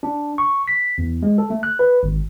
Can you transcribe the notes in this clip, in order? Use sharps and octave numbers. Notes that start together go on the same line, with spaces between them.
D4
C#6
B6
E2
G#3
A4
A3
F#6
B4
G#1